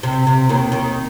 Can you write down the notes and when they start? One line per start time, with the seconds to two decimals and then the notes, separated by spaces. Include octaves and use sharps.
0.03 C3
0.27 C3
0.49 D#2 D#3
0.72 D#2 D#3